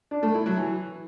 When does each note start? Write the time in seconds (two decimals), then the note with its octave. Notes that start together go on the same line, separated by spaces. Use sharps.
0.11 D4
0.23 A3
0.34 E4
0.46 F#3
0.57 E3